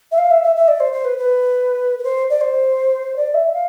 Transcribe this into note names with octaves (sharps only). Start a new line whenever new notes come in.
E5
F5
E5
E5
E5
D5
C5
C5
B4
B4
B4
C5
D5
C5
D5
E5
F5